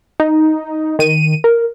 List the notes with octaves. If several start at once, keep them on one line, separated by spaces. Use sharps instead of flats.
D#4
D#3 D#7
A#4